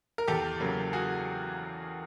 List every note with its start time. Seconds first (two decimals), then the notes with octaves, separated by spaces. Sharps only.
0.18 A#4
0.27 E2 G4 A4
0.60 C#3 F#3 A#3
0.93 F#4 G#4